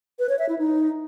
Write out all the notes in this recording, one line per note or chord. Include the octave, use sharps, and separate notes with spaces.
B4
C#5
E5
E4
D#4